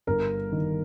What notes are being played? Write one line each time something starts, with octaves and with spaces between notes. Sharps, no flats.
G1 A#4
D#3